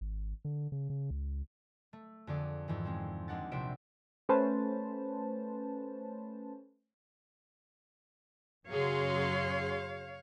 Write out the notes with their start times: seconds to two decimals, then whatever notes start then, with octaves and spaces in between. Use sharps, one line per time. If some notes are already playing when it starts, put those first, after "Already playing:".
0.01 G#1
0.45 D3
0.72 C#3
0.90 C#3
1.10 C#2
1.93 A3
2.27 F2 D3 G#4 D5
2.68 F2 G#2 D#3 E3
2.84 G#3 C4 C#4
3.28 D#2 G#3 D4 F#5 A6
3.51 A#1 C3 C5 E5 D7
4.29 A3 C#4 B4 C5 A5
8.68 F#2 C#3 F#3 G#4 C#5 F5 C6